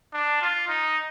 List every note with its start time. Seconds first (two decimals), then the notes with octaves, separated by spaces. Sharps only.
0.13 D4
0.41 F4
0.68 D#4